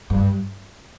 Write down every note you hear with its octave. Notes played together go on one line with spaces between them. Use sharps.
G2